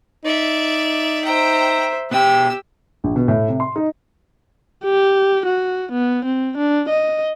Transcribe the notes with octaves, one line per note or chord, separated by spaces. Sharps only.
D#4 D5 E5
C5 E5 G5 A#5
B2 G4 G5 E6
A#1
B2
A2
C3
C6
D#4
G4
F#4
B3
C4
D4
D#5